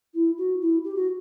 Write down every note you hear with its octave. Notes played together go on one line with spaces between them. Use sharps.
E4
F#4
E4
G4
F#4